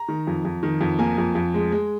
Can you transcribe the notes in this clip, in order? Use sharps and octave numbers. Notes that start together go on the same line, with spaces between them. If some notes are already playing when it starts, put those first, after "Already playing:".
Already playing: A#5
D#3
F2
F2
D#3
F2
A#3 G#5
F2
F2
G#3
G#3